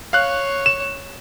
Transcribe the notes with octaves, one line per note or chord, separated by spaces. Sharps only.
C#5 F5 F#6
E7